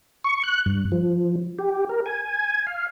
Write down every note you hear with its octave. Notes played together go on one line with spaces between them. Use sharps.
C#6
F#6
G2
F3
G4
A#4
G#5
F5